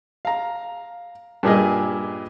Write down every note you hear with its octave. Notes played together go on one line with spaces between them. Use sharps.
F5 A#5
G2 A#2 G#4 D#5